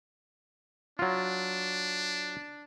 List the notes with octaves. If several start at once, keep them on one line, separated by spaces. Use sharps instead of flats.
F#3 D4 F4